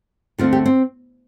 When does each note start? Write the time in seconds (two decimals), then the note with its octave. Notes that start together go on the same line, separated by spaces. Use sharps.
0.38 D2 D3 A3 C4 F4
0.53 G4
0.66 C4